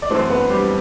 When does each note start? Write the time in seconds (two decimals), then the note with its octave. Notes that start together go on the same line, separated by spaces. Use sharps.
0.02 D5
0.10 F#2 E3 A3 C4 C5
0.30 B3 B4
0.50 G3 G4